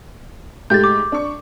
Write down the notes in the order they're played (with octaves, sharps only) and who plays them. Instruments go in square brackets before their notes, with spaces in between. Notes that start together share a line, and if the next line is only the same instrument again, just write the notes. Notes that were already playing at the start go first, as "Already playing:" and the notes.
[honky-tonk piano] G#2 A3 G4 [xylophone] G6 A6
[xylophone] D6
[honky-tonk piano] D4 C#6